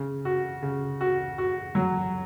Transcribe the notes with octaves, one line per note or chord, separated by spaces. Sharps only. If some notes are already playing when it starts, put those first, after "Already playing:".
Already playing: C#3
F#4
C#3
F#4
F#4
F#3